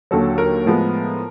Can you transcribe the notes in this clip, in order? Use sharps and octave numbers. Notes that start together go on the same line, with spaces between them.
D#2 D3 F#3 A4
A#4
A2 F3 G#3 B3